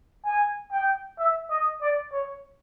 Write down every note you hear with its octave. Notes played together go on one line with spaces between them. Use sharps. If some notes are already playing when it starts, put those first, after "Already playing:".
G#5
G5
E5
D#5
D5
C#5